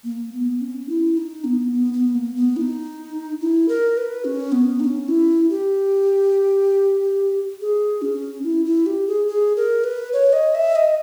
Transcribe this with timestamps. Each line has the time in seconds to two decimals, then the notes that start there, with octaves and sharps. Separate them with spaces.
0.04 A#3
0.33 B3
0.61 C#4
0.89 E4
1.17 D#4
1.44 B3
1.73 B3
1.93 B3
2.15 A#3
2.35 B3
2.56 E4
2.61 D#4
3.41 E4
3.68 A#4
3.97 B4
4.24 C#4
4.52 B3
4.80 D#4
4.84 C#4
5.08 E4
5.50 G4
7.61 G#4
8.02 C#4
8.44 E4
8.65 E4
8.86 G4
9.07 G#4
9.28 G#4
9.56 A#4
9.84 B4
10.13 C#5
10.33 D#5
10.55 E5
10.75 D#5